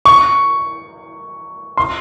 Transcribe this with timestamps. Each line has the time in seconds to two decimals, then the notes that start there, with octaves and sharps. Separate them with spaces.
0.05 C#6
1.77 C6